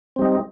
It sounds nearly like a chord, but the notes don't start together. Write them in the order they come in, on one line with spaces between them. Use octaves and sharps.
C4 G3 D#4